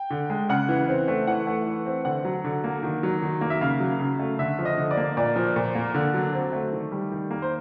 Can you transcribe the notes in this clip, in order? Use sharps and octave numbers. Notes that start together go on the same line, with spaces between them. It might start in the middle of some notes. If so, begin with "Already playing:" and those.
Already playing: G5
D3
G#3
C#3 F#5
E3
C4
A3
E3 F#5
A3
E3
C4
D3 F#5
F#3
D3
A#3
D#3
F#3
D#3
A#3
E5
C#3 F5
F#3
C#3
A3
D3 E5
F3
D#5
D3
D5
A#3
A#2 D5
F3
A#2
A#3
D3
F#3
C4
A3
D#3
G3
D#3
A#3
C5